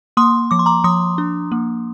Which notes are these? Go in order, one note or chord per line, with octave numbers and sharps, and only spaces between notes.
A#3 C6 D#6
F3 D6
C6
A#5 D6
F3 C6 D#6
D4
A#3